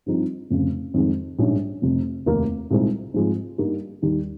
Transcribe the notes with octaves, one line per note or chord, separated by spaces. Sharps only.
G2 F3 C4 D#4
F1 F2 C#3
F2 D#3 G#3
A#1 G#2 G3 C#4
F1 F2 C3
F1 D#2 D#3 A#3
C2 A#2 G#3 C4 D#4
G#2 F3 G#3 C4
G2 G3 A#3 D#4
D#2 D#3 G3